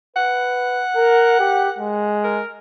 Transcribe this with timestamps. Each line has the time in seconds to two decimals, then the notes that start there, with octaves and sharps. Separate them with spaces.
0.16 B4 F#5
0.96 A#4
1.40 G4
1.78 G#3
2.24 A#4